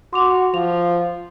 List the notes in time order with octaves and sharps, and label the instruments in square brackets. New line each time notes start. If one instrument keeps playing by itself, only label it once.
[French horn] F#4 [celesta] C6 D6 F7
[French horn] F3 [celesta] F7